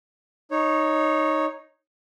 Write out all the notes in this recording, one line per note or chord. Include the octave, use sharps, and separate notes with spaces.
D#4 C#5